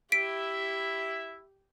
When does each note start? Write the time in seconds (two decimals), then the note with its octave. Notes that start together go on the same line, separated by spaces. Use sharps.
0.12 E4 G4 E5 B6 D7